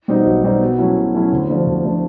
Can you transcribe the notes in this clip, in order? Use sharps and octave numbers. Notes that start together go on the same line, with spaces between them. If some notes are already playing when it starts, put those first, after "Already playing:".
B2 G3 C4 D#4
B1
B2 G3 C4 D#4
B2
F#3 A3 C#4 E4
B2
F#3 A3 C#4 E4
D2
D3 F3 A3 D4
D2
D3 F3 A3 D4